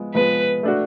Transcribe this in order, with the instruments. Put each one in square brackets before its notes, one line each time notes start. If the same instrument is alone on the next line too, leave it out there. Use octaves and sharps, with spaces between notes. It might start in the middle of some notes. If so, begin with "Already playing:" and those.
Already playing: [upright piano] F3 G#3 B3
[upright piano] F3 G#3 B3 [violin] B4
[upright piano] A3 D4 F#4